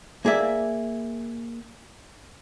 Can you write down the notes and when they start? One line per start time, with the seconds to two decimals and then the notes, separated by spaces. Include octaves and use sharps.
0.25 A#3 G#4 D5 E5